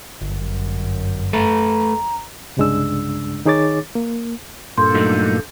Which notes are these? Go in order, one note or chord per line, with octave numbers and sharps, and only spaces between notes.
G1 F#2
A3 A4 B4 A#5
C2 G2 C#3 G#3 D4 E6
D#3 D#4 G#4 C#5 D6 A6
A#3
G2 A#2 A#3 D4 A4 C6 G6
F#3 A3 D#4